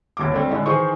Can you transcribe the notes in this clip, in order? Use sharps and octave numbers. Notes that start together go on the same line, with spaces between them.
G1 D#2 D6
G3 A3 C4 D4
A2 D3 G#3 D4 D#4
D#3 E3 G#4 C5 C#6